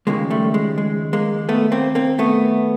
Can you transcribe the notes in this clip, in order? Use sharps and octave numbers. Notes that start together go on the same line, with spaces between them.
D#2 C#3 F3 G#3 A#3
G3 A3
G#3
G#3
G#3 A#3
A3 B3
A#3 C4
A#3 C4
A3 B3